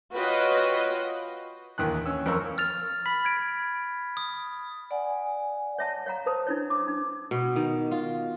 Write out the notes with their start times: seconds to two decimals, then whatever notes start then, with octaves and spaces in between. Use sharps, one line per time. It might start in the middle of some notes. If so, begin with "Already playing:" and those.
0.14 F4 F#4 B4 C#5 D#5 G5
1.78 D#2 D#3 E3 F#6
2.06 C#4 E6
2.26 F2 A#4 C5 C#6 E6
2.58 F6 A6 F7
3.06 B5 B6
3.25 G#6 D7
4.17 D#6
4.91 D5 F#5 G#5
5.78 C#5 E5 A5
6.06 C#5 F5 A#5
6.26 B4 C5 A5 D#6
6.47 D4 E4 C#5
6.70 D6
6.88 D4
7.31 B2
7.56 D#3
7.91 F4